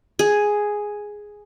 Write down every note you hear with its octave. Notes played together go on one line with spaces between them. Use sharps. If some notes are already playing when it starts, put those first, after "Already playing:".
G#4